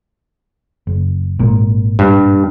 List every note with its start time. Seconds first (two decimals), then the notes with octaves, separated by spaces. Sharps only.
0.87 F#1
1.39 G#1 A#2
1.99 G2